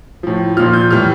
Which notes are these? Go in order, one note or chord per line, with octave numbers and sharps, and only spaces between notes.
A2 F3
A#2 F3 F6
G6
A2 E3 G3 F6